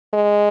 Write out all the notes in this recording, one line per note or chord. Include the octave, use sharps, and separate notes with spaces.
G#3